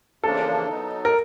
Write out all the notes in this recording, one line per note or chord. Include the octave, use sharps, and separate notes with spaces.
E2 C#3 F3 A#3 D4 A4
F#3 B3 D#4
A#4